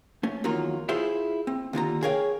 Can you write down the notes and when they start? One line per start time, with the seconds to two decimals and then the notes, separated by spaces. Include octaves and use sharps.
0.23 A3 C#4
0.44 E2 D#3 F#3 A#3 F4 A#5
0.89 E4 F4 G#4 C5 E5
1.47 C4
1.73 D#2 D3 F4 A#5
2.03 G#4 A#4 C#5 F5 G5